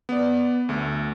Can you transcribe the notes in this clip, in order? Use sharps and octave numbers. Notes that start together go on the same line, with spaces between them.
B3 D5
D2 A3